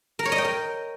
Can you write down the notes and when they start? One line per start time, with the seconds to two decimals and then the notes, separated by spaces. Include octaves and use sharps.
0.19 A#4
0.25 C#5
0.32 D#5
0.38 G5
0.45 A#4